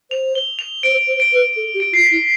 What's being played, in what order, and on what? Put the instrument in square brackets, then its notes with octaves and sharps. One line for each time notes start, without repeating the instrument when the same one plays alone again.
[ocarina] C5 [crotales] F7
[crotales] G7
F7
[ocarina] C5 [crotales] D7
[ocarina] C5
[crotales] D7
[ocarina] B4
A4
G4
[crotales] D7
[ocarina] F4 [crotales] C7
[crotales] B6
[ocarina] E4